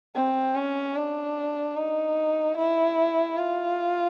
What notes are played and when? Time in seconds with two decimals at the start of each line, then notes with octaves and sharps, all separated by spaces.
0.15 C4
0.55 C#4
0.96 D4
1.76 D#4
2.57 E4
3.37 F4